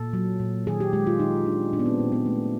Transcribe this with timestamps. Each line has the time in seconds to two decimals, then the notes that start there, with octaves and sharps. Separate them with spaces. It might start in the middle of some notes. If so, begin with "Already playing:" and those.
Already playing: A#2 A4
0.13 F#3
0.40 A#2
0.67 D#3 G#4
0.80 G4
0.93 G#3 G4
1.07 F4
1.20 D#3 D#4
1.46 D#3 D4
1.73 A#2 D4
1.79 B3
1.86 C4
1.99 A#2 A#3
2.12 B3
2.26 A3